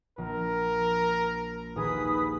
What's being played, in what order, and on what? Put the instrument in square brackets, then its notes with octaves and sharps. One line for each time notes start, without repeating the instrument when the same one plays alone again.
[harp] A#1 [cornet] A#4
[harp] D#1 G#4 [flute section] B4 D#6